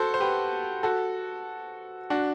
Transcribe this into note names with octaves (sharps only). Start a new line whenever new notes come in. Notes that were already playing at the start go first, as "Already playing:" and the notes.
Already playing: F#4 A4 C5
C5
G4 B4
F#4 A4
D4 F#4